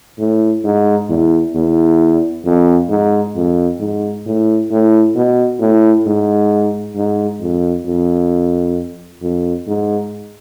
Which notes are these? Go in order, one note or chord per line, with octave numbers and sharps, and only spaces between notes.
A2
G#2
E2
E2
F2
G#2
F2
G#2
A2
A2
B2
A2
G#2
G#2
F2
F2
F2
G#2